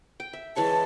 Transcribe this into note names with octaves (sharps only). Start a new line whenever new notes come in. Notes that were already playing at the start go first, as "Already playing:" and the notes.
G5
E5
E3 G#3 C#5 A5